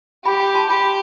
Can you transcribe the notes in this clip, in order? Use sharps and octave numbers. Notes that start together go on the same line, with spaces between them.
G4 G5 B5
G5 B5
A5 C6
G4 G5 B5